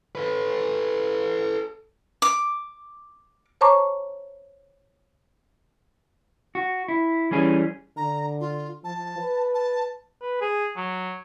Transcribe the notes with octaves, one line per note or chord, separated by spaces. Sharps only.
A4 B4
D6
C5 C#5 A5 A#5 C#6 D6
F#4
E4
E3 G3 C#4 G#4
D3 A#5
F4
F3 A5
B4
A5
B4
G#4
F#3